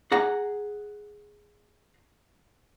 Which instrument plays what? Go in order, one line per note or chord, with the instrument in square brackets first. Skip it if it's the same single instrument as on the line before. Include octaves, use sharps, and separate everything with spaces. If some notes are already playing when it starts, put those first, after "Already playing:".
[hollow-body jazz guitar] G#4 F#5 A#5